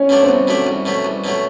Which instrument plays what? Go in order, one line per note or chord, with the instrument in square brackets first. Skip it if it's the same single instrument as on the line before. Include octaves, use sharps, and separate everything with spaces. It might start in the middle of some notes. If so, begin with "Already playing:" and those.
Already playing: [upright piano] C#4
[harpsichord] B2 F#3 A3 D4
[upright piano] C4
[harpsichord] C2 [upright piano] B3
[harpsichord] B2 F#3 A3 D4
C2
B2 F#3 A3
C2
B2 F#3 A3